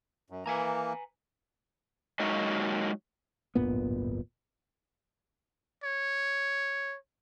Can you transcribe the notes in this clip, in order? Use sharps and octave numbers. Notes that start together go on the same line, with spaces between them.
F#2
E3 A#3 B4 G#5 A#5
F#3 G#3 A#3 D#4 F#4
D1 G1 A#2 B3
C#5